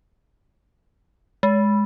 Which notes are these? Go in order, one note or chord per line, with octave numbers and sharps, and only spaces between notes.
G#3